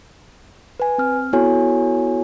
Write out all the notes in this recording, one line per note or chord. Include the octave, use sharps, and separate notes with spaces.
B4 G#5
C4 F6
B3 E4 F#4 A4 C#5 G#5